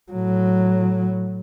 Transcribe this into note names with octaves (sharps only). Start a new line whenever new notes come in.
A2 F#3